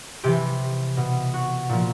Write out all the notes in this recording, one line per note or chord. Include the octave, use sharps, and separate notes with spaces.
C3 E3 G4
B2
F#4
A#2 F3